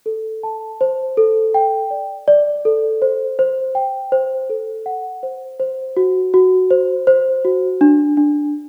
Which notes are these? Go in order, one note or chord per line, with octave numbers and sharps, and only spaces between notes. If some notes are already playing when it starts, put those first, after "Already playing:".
A4
A5
C5
A4
G5
D5
D5
A4
C5
C5
G5
C5
A4
F#5
C5
C5
F#4
F#4
C5
C5
F#4
D4
D4